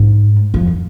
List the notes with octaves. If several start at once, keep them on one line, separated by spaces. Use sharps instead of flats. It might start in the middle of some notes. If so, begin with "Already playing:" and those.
Already playing: G#2
F2